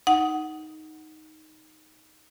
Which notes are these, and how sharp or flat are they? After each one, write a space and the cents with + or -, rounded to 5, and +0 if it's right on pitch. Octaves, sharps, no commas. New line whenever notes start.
D#4 +5 F#5 +0